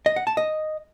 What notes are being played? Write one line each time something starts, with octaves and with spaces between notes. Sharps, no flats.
D#5
F#5
A5
D#5